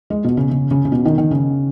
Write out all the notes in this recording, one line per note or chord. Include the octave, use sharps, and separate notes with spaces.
G#3
B2
C#3
C#3
C#3
C#3
B2
D#3
D#3
C#3